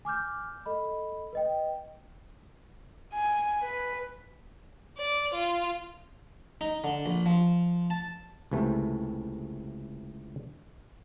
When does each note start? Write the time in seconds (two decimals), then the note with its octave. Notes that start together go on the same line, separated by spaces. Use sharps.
0.05 G#5 D6 F6 G6
0.66 A4 D#5 B5
1.33 B4 D#5 G5
3.13 G#5
3.62 B4
4.98 D5
5.34 F4
6.61 D#4
6.84 D3
7.06 A#1
7.26 F3
7.90 A5
8.51 C#2 C3 E3 A3